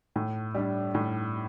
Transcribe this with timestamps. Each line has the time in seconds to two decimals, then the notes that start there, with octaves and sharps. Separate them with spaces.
0.16 A2
0.54 G3 D4
0.95 A2